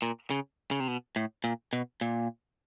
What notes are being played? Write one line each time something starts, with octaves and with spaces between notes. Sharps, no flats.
A#2
C#3
C#3
C3
B2
A2
A#2
B2
A#2